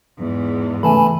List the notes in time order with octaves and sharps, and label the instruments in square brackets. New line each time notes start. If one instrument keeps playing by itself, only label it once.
[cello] E2 G#2
[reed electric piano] C#3 A3 [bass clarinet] E3 [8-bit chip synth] G#5 A5 B5